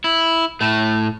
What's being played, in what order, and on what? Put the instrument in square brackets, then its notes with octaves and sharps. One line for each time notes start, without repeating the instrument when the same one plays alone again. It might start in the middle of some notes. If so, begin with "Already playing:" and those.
[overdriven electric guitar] E4
A2 A3